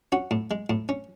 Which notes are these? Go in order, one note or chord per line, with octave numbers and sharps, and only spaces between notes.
C#4 F#4
A2
G#3
A2
C#4